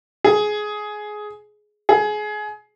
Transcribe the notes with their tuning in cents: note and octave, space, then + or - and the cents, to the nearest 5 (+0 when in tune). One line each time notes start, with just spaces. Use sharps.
G#4 +15
G#4 +25